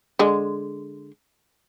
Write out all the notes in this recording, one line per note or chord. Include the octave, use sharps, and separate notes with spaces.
D3 G#3